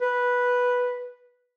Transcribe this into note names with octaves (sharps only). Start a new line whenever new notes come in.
B4